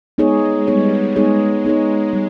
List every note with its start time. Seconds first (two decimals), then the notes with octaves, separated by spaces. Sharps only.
0.18 G#3 B3 D#4 G#4 C#5
0.67 G3 B3 D#4 G#4 C#5
1.16 G#3 B3 D#4 G#4 C#5
1.65 B3 D#4 G#4 C#5
2.13 G3